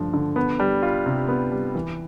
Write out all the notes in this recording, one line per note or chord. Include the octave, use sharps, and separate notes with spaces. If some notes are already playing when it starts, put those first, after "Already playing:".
Already playing: G2 D3 F3 A3
D3
B3
G3
F4
C3
B3
G3
E3